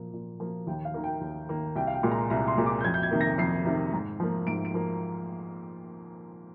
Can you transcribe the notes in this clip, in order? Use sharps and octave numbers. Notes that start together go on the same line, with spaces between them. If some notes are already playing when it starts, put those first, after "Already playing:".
Already playing: A#2 F3 A#3
A#2
F3 A#3
D#2 G5
F5
D#3 A#3
G5
D#2
D#3 A#3
C2 G5
F5
G5
A#2 G#3
A#5
C2 A#5
C6
A#2 G#3
D6
G6
F2 G#6
G6
G#6
C3 D#3 A#3
A#6
F2 C7
C3 D#3 A#3
G#2
F3 A#3
G#2 D7
D7
F3 A#3